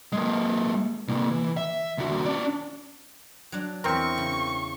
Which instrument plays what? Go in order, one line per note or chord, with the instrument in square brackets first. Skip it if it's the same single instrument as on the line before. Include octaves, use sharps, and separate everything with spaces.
[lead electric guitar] G#3 A#3
C3 A#3
E3
E5
D#2 F#4
C#4 D5
[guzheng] F#3 D4
[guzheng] E2 E5 [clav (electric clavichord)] C4 A#4 [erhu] C#6
[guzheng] C#3